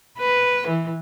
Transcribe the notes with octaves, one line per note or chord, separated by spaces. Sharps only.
B4
E3